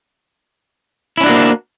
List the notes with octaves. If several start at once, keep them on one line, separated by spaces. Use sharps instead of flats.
A#3 C#4 D4 E4 F#4